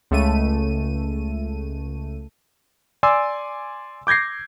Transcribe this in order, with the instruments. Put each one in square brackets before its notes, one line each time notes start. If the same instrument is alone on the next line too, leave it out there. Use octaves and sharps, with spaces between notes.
[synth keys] C#2 A3 D#7
[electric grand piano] D5 G#5 C6 D6 E6
D6 G6 G#6 A#6 C7